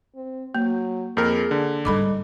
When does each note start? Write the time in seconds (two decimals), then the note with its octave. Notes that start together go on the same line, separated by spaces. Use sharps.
0.16 C4
0.55 F#3 A#3
1.17 F2 A#3 G#4 A#4
1.51 D3
1.85 G#2 G3 D#4 A4 B5 D6